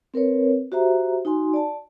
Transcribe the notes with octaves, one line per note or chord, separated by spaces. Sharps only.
C4 A#4 B4 C#5
F#4 G4 C5 E5 A#5
D#4 F#4 G#5 C6
D5 A5